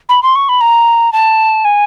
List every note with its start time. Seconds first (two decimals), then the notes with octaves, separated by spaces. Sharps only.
0.09 B5
0.23 C6
0.35 C#6
0.49 B5
0.61 A#5
1.13 A5
1.65 G#5